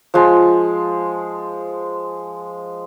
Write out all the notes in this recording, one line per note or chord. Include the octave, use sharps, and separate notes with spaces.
F3 G#3